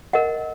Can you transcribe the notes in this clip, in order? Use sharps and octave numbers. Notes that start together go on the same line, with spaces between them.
A#4 D#5 F#5